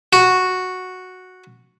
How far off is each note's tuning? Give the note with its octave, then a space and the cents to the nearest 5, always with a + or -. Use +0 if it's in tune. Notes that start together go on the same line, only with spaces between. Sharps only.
F#4 -5